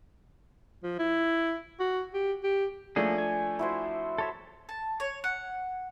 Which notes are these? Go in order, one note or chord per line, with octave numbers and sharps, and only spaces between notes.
F3
E4
F#4
G4
G4
F3 A3 A#3 C#4 D4 G#4
G#5
E4 F#4 C5
A4 C#5 E5
A5
C#5
F#5